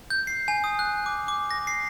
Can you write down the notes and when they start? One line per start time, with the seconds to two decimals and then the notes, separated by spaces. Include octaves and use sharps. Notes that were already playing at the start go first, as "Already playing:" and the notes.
0.10 G6
0.27 C7
0.48 G#5
0.64 D#6
0.79 F#6
1.06 D6
1.28 D6
1.51 A#6
1.67 C7